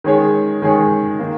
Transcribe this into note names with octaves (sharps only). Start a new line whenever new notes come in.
D#3 G#3 C#4 G#4 C#5
D#3 G#3 C#4 G#4 C#5
D#3 A#3